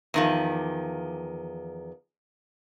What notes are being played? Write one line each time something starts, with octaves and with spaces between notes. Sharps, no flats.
E2 D#3 F3